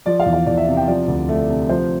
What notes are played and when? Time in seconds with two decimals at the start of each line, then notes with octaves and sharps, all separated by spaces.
0.06 F3 D5
0.20 F5
0.26 E2
0.33 F5
0.46 E2 D5
0.57 E5
0.67 C3
0.77 G5
0.87 F3 D5
1.08 D2
1.29 A3
1.50 C3
1.69 F3 C5